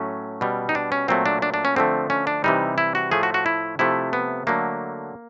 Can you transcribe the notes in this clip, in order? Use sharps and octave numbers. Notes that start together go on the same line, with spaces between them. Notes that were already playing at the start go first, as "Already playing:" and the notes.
Already playing: A2 F#3 A3 C#4
B2 G3
D#4
D4
C#4
A#2 F#3 A3 C4
D4
D4
D4
C#4
D3 F3 A3 C4
C#4
D4
C3 E3 G3 D#4
E4
F#4
A2 F3 A3 G#4
F#4
F#4
E4
C3 F3 A3 E4
B3
D3 F#3 A3 A#3